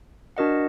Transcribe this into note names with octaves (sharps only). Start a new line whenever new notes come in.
D4 F#4 A#4 D#5 F#5